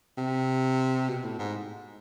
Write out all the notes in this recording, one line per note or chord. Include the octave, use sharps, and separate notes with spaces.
C3
B2
A2
G#2